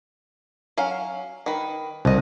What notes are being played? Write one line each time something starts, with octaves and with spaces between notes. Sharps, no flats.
F#3 C#4 F5
D#3 B4
C2 A3 D#5